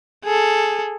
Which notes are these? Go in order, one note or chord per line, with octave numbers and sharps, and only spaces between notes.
G#4 A4